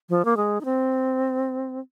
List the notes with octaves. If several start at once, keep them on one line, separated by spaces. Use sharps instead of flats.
F3
A#3
G#3
D#4
C4